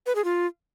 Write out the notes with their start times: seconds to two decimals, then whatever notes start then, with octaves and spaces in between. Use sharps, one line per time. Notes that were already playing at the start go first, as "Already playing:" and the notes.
0.06 B4
0.15 G#4
0.24 F4